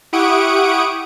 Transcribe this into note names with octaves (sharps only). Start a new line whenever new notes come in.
E4 G4 F#5 C#6 D#6 D7